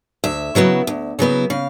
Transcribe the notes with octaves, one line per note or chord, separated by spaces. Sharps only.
D2 E5
C#3 F#3 B3 E4
D2
C#3 F#3 B3 E4
C#3 F5